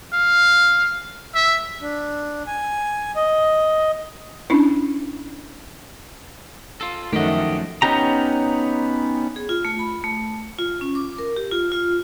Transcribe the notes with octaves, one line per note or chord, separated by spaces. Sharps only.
F5
E5
D4
G#5
D#5
C#4 D4 E4
F4 A4
F#2 D#3 F3 A3 G4 D#5 F#5
B3 C#4 D#4 G4 A#5
G#4
F4
A3
B5
A3
F4
C#4
D6
A#4
G4
F4
F4